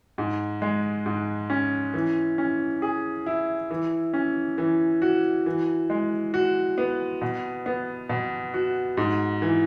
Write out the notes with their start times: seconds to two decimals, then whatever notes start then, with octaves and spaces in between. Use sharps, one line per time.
0.18 G#2
0.62 G#3
1.06 G#2
1.50 C#4
1.94 E3
2.38 C#4
2.82 G#4
3.26 E4
3.71 E3
4.14 C#4
4.58 E3
5.02 F#4
5.46 E3
5.90 G#3
6.34 F#4
6.78 B3
7.22 B2
7.66 B3
8.09 B2
8.54 F#4
8.97 G#2
9.42 E3